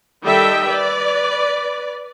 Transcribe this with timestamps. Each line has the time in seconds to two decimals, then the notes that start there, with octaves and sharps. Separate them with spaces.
0.24 D#3 G3 A4 D#5 E5 G5
0.67 B4 D5